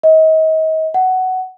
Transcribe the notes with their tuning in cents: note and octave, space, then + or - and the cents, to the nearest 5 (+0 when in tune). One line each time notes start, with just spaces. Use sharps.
D#5 +35
F#5 +10